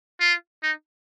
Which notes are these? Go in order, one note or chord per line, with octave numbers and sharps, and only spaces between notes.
F4
D#4